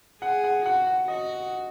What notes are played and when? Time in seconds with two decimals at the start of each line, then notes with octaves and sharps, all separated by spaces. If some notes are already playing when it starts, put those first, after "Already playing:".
0.22 G#4 F#5
0.44 F#5
0.66 F#4 F#5
0.87 F#5
1.08 F#4 D#5